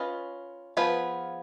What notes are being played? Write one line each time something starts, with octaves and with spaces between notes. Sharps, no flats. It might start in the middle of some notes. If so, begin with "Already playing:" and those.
Already playing: C#4 F4 B4 D#5
F3 B3 F4 G#4 B4